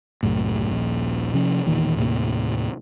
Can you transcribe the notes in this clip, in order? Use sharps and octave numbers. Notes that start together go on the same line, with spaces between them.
C2 F#2 A2
D#1 A#1 A#3
C3 F3 C#4
E1 E2 A#2 D#3
D#2 A2 C3 A#3